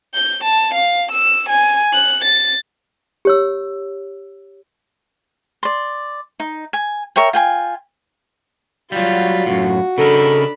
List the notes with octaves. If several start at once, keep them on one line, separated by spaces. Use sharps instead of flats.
G6
A5
F5
E6
G#5
F#6
A6
G4 C#5 E6
D5 C6
D#4
G#5
A#4 C#5 E5 G5
F4 G5 G#5
F#3 G3 F4 F#4
F#2 A2
C#3 D4 D#4 A4 A#4 B5